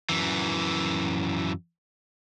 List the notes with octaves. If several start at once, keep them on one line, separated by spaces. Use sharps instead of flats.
F#2 E3